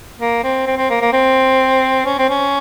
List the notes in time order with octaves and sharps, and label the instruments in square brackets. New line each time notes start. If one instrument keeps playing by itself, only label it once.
[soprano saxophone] A#3
C4
C4
C4
A#3
A#3
C4
C#4
C4
C#4